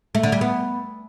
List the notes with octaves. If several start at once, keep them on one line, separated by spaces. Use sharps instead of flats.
A3
D3
G3
B3